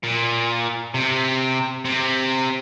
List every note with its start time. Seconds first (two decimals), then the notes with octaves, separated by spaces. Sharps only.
0.04 A#2
0.94 C3
1.85 C3